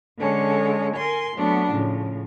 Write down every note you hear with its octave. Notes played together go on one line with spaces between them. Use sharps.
D3 G#3 C#4 A4
A#4 G#5 C6
F#3 A3 B3 D4
A2 C#3 F3